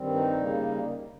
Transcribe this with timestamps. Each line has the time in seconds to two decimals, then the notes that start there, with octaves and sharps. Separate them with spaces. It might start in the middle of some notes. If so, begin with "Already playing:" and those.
Already playing: G2 D#3 G3 C4
0.15 D#4
0.37 C#3 G3 A#3